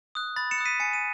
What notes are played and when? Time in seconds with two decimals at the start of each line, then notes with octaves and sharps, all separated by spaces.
0.15 D#6 F#6
0.36 B5 A6
0.51 C#7 E7
0.58 D#6 F#6
0.65 B6 D#7
0.80 G#5 C#7
0.93 D#7